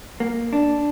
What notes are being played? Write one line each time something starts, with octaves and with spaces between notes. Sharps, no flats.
A#3
D4